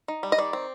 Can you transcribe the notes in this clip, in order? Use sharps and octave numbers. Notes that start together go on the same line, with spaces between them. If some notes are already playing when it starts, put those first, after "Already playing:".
D#4
G3
D#5
D#3 D5
C4